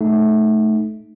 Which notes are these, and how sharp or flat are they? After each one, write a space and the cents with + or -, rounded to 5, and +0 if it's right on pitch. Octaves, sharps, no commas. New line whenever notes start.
A3 -15 D#4 +0